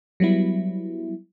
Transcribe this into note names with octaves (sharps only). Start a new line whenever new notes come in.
F#3 G3 B3 E4